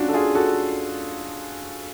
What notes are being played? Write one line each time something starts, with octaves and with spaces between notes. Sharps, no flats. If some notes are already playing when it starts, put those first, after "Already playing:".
Already playing: C#4 D4 F4 F#4
A4
F4 G#4
F#4 A4